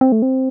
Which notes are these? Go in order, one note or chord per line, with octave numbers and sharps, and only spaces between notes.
C4
A3
C4